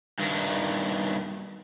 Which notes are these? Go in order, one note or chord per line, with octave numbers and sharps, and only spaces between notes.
G2 D#3